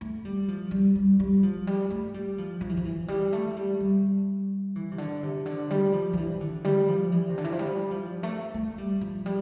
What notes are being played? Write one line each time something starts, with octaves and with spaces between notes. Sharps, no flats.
A3
G3
F3
G3
G3
G3
F3
G3
A3
G3
F3
F3
E3
F3
E3
G3
A3
G3
G3
E3
C3
D3
C3
D3
G3
F3
F3
E3
D3
G3
F3
E3
C3
D3
E3
F3
G3
F3
A3
A3
G3
F3
G3